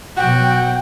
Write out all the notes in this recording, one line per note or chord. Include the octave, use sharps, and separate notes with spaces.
B2 F#3 F#4 G5